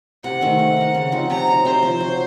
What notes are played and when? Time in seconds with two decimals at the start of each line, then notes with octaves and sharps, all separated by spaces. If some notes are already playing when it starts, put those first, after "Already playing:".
0.24 C3 F#5
0.41 D#3 A3 C4
0.59 A#3
0.77 D#4 A#4
0.95 C#3
1.12 F3 C4 D#4
1.29 C3 A#5
1.47 F#3 C4 D#4
1.65 C3 C5
1.83 F3 C4
2.00 F#3